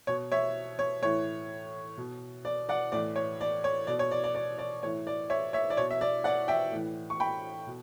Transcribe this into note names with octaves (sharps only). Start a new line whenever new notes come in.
B2 C#5
C#5 E5
C#5
A2 E3 C#5
B2
D5
D5 F#5
A2 E3 D5
C#5
D5
C#5
B2 D5
C#5
D5
D5
D5
D5
A2 E3 C#5
D5
C#5 E5
C#5 E5
D5
B2 C#5
E5
D5
D5 F#5
E5 G5
A2 E3
C#6
G5 B5
B2